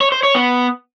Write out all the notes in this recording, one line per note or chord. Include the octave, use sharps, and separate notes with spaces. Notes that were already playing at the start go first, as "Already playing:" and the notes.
C#5
C5
C#5
B3